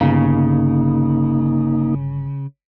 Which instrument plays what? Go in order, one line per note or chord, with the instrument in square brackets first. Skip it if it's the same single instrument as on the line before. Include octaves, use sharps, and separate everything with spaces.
[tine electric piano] G1 [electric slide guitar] C#3 [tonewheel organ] A#3 D#4